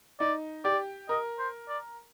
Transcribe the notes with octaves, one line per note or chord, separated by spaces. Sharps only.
D#4 D5
G4 D5
A#4 D#5
C5
D5